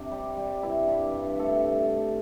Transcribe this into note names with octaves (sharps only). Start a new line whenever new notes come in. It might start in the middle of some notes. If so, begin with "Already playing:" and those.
Already playing: C3 D4
G3
G3
G2 E4
G2
G2
A3 A4
A3